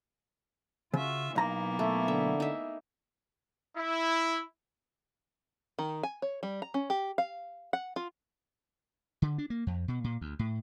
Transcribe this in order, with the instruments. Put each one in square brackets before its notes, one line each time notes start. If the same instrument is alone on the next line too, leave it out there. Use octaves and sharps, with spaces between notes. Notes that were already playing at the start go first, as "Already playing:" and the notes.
[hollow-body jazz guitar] C#3 [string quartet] F4 F#4 E5
[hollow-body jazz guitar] B1 A#5 [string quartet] E3 A#3 B3
[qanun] A3
[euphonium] D3 [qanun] E5
[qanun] D#4 E5
[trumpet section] E4
[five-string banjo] D#3
G#5
C#5
G3
A#5
C#4
G4
F5
F#5
F4
[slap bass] D3
D4
A#3
F2
B2
A#2
D2
A2